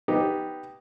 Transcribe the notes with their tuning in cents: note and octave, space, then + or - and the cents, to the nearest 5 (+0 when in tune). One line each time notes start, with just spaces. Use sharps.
B3 +0 D#4 +0 G4 +0